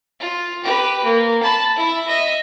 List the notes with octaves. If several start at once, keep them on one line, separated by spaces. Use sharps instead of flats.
F4
G4 B4
A#3
A5 B5
E4 E5
D#5 E5